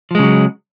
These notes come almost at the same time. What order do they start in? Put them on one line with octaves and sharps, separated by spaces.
F3 G#3 C#3 F#3